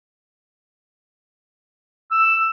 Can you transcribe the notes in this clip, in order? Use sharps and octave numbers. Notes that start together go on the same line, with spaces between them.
E6